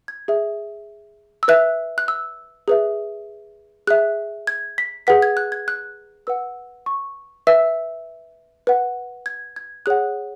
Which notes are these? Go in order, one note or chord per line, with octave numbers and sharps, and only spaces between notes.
G#6
G#4 E5
E6
B4 E5 F#6
F#6
E6
G#4 B4 E5
G#4 E5 F#6
G#6
B6
G#4 B4 F#5 B6
G#6
F#6
G#6
F#6
B4 F#5 E6
C#6
B4 E5 E6
B4 F#5
G#6
G#6
G#4 C#5 F#5 F#6